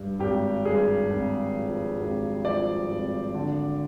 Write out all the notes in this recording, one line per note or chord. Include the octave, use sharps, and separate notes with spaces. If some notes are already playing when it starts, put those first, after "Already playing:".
Already playing: G2
G#1 G4
G2 G#4
G#1
F3
G#1
F3 D5
G#1
D3